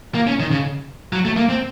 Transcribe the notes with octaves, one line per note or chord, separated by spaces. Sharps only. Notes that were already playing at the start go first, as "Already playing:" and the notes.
A#3
C#4
D#3
C#3
F#3
A3
A#3
C4